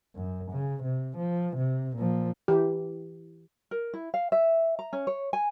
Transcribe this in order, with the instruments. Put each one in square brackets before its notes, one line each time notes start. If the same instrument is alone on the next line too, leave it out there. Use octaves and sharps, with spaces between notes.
[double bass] F#2
C#3
C3
F3
C3
A#2 F3
[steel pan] E3 G4
[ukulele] A#4
E4
F5
E5
A#5
C#4
C#5
G#5